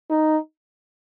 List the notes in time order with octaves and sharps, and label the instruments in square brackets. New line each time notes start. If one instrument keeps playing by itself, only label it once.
[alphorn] D#4